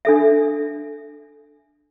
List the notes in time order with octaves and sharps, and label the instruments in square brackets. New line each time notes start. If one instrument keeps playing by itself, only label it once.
[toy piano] D4 A4 E5